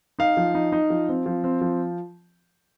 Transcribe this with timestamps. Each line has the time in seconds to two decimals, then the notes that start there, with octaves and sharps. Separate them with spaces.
0.19 D#4 F5
0.37 F3
0.55 D#4
0.72 D#4
0.90 F3
1.09 C4
1.26 F3
1.44 C4
1.61 F3